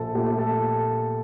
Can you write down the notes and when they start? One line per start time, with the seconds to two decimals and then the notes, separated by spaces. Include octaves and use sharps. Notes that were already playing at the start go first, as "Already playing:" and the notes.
Already playing: A#1 A4
0.15 A#2 A3 G4
0.39 A4